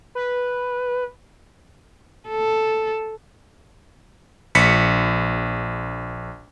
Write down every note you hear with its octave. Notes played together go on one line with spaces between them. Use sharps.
B4
A4
A#1 B6 C#7